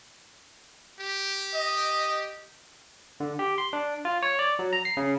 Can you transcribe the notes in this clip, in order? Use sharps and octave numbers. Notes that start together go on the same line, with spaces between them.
G4
D#5
D3
G4
C6
D4
F4
C#5
D5
F#3
A#5
C7
C#3